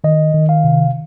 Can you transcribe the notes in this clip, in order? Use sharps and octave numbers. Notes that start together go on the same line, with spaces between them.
D#3 D#5
D#3
F5
C3